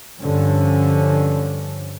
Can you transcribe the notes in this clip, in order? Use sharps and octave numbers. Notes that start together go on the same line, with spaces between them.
G2 D3 F3 C#4